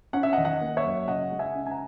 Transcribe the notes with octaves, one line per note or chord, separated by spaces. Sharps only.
C#4 F#5
E5
D#5 F#5
D#3
D#5 F#5
A#3
C#5 E5
F#2
C#3 D#5 F#5
G#3
E5 G#5
C#4
G#5
F#5 A#5